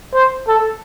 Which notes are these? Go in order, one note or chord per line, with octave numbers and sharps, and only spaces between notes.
C5
A4